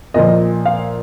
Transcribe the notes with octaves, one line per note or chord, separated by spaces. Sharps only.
A#2 F3 D#5
F5